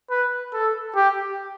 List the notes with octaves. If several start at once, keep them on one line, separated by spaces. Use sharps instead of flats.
B4
A4
G4